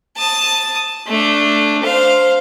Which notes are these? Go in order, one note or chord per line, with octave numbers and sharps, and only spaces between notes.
A5 D#6
A3 D4
C5 F5